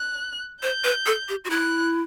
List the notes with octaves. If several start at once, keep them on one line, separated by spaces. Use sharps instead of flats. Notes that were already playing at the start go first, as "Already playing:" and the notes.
Already playing: F#6
C5 G6
B4
A4
G4
F#4
E4 F#6